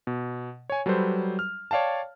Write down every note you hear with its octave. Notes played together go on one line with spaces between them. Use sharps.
B2
C#5 G#5
F#3 G3 A4 B4 C5
F6
C#5 D5 F5 G5 A5